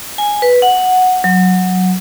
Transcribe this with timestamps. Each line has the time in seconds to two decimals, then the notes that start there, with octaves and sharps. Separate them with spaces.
0.18 G#5
0.42 B4
0.62 F#5
1.24 F#3